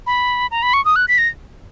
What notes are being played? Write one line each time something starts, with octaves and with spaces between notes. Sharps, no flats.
B5
A#5
B5
C#6
D#6
F#6
B6
A#6